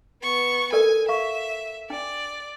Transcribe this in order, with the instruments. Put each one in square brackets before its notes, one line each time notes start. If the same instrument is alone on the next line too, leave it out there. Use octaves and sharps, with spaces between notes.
[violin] B3 C#6
[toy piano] A4 A#4 D5 [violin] G#5
[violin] E5 [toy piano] F5 C#6
[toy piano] D4 G5 [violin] D5